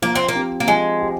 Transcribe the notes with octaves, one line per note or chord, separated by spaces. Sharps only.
F3 A#3
C4
A#3
C4 G4
A#3
F3 G#3
G4